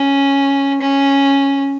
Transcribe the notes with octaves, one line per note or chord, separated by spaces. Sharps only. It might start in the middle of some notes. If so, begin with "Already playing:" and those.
Already playing: C#4
C#4